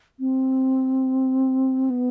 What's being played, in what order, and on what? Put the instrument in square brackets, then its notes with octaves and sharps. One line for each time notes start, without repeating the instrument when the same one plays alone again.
[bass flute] C4
B3